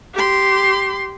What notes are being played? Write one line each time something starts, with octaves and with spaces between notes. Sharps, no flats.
G4 C6